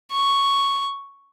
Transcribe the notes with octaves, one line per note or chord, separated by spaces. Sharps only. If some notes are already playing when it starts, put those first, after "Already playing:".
C#6